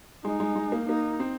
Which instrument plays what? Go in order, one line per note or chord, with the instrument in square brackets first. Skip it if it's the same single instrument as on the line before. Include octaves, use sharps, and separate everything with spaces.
[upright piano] G#3 [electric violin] D#4
[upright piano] G#3
G#3
A#3
[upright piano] A#3 [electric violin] D#4
[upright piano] C4